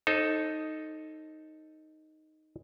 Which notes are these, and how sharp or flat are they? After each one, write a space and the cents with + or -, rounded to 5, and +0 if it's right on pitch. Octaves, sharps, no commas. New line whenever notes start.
D#4 +0 A4 +0 C5 +35